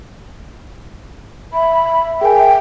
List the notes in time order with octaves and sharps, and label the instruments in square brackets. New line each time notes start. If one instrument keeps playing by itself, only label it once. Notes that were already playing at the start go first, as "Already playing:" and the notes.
[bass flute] E5 [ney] B5
[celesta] G#4 A#4 G#5 [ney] G5